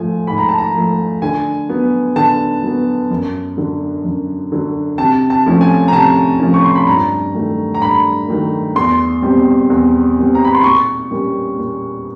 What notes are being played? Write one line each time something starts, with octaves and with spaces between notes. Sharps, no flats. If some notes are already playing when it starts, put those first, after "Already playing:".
Already playing: G#2 F3 A3 G#5
G#2 B5
A#5
A5
A#5
F3 A3
D3 G#5
F#3 B3
D3 A5
F#3 B3
F#2
D3 F#3
F#2
D3 F#3
C3 A5
A5
F3 A3 C#4
G#5
A#5
C3 A5
F3 A3 C#4
C#6
C6
B5
G2 A#5
D#3 F#3 A3
A#5
G2 B5
D#3 F#3 A3
E2 C6
B2 G3 C4
E2
B2 G3 C4
A#5
B5
C6
A#2 C#6
G3 A#3 C#4
A#2